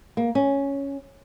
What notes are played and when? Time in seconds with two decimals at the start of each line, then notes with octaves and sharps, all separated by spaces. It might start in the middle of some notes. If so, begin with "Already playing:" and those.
0.17 A#3
0.35 C#4